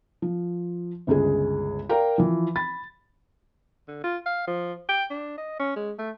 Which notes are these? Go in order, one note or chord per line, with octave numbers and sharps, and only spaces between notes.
F3
G1 C#2 G#3 G#4
A#4 D5 F5 G5 A#5
E3 F3
B5 A6
D3
F4
F5
F3
G5
D4
D#5
C#4
G#3
A3